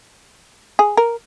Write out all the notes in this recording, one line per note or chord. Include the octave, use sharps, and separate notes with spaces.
G#4
A#4